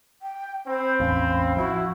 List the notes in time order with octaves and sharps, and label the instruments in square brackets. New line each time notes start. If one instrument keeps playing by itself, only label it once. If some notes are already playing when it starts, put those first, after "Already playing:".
[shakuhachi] G5
[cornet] C4 [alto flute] C5 [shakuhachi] B5
[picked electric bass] A1 E2 C#4 [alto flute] F5
[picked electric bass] F3 [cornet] E4 [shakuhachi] F#4